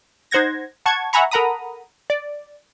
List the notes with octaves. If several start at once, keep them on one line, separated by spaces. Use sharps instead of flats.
D#4 C5 F#5 G#6 A#6
F#5 A5 C#6 G#6
E5 F#5 G#5 A#5 B5 C#6
A4 A#4 F#5 A#5 B5 D#6
D5